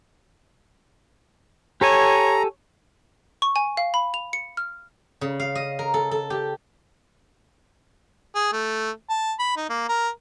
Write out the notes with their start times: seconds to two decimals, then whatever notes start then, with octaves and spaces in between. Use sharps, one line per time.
1.81 G4 A4 C#5 G#5 A#5
3.42 C#6
3.56 G#5
3.77 F5
3.94 B5
4.14 F7
4.33 C#7
4.57 F6
5.21 C#3
5.40 F5
5.55 D#5
5.79 A#4
5.94 A4
6.11 A4
6.30 G4
8.35 G#4
8.53 A3
9.10 A5
9.39 B5
9.57 D#4
9.69 A#3
9.89 A#4